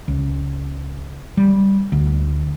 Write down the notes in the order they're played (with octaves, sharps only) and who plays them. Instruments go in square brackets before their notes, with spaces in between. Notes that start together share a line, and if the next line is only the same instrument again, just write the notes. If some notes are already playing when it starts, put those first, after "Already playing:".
[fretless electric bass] C#2
G3
D2